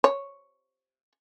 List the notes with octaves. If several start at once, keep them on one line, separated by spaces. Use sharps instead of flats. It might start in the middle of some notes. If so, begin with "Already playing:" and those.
C#5